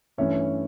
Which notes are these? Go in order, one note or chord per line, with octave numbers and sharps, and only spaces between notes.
G2 E3 A3 C#4 C#5 E5